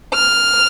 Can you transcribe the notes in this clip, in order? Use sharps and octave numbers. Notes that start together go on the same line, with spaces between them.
F6